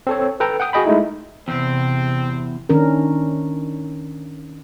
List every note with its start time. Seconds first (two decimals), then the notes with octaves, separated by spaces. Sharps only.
0.07 C4 A4 C#5
0.40 A4 B4 G5 A#5
0.60 F#5 G5 D#6
0.73 F#4 G#4 D#5 G5 B5
0.85 G#3 A3 D#4 E4
1.48 E2 C3 C4
2.69 D#3 C#4 D4 A#4